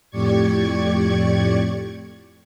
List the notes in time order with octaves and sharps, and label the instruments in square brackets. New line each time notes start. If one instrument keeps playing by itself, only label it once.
[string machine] F2 A2 G4 D5 C#6 G#6